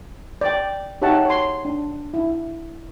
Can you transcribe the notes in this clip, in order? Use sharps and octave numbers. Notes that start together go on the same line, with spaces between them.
D5 G5
D#4 G4 C#5 E5 F#5 A5
C#5 C6
D4
E4